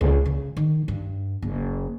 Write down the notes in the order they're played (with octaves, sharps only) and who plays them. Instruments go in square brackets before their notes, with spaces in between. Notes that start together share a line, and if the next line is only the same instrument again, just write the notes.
[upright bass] C#2
C#3
D#3
G2
F#1